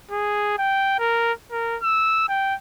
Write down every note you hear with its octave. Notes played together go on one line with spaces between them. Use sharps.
G#4
G5
A#4
A#4
E6
G5